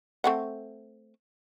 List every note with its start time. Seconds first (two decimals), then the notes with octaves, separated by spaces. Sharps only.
0.24 A3 C4 F#5